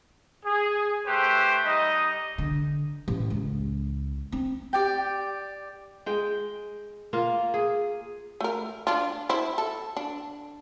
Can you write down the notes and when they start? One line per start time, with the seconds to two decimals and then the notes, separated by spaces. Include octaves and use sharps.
0.44 G#4
1.06 A3 G4 B4 C5
1.64 G3 D#4 D#5
2.38 D3
3.08 A1
3.30 C#2
4.32 C4
4.73 G4 D5 G5
6.06 G#3 G5
7.13 A#3 F4 A#4
7.54 G#4
8.41 A3 A#4
8.87 D4 F4
9.29 E4 C5
9.58 A4
9.97 D4